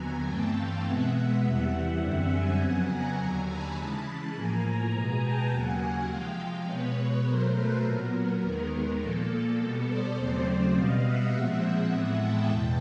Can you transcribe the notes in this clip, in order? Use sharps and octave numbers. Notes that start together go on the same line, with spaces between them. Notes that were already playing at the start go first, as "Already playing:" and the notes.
Already playing: D#2 D3 F#3 B3 G#5 A#5
G2 E3 A3 C4 G5 A5
F5 G5
B2 G#3 B3 E5 F#5
E5 F#5
E2 C3 E3 G3
F#2 D3 G3 C4
F#5 G#5
F2 C#3 F#3 B3
G#5 A#5
D#2 D3 F#3
A5 B5
C#3 E3 G#3
A5 B5
A2 F3 A#3 G#5 A#5
G#5 A#5
B2 G#3 B3
G5 A5
D#2 C#3 F#3 A#3 F#5 G#5
C3 F3 G#3 F5 G5
B2 G#3 B3 B4 C#5
B2 F#3 A3 A#4 C5
A4 B4
A#2 F#3 B3 A#4
D#2 D#3 G#3 B3
A#2 F3 A#3 A4
B2 G3 B3
C5 D5
D#2 C#3 F#3 A3 C4
B2 G3 B3 D#5 F5
E5 F#5
A#2 F3 G#3 C4
E5 F#5
A2 E3 G#3 B3
G5 A5
E2 B2